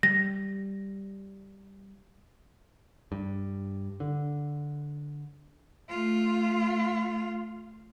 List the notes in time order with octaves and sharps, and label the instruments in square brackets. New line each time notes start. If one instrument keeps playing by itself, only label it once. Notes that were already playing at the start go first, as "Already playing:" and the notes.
[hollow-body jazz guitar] G3 [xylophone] A#6
[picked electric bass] G2
D3
[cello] A3 F4